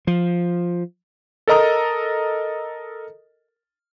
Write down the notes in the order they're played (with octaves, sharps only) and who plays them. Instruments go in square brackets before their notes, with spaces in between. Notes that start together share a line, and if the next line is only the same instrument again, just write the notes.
[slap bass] F3
[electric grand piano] A4 A#4 D#5 A#5 D#6